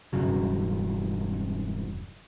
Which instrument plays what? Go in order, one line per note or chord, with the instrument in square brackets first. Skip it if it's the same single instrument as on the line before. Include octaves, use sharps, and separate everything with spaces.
[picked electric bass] E1 G2 C#3 F#3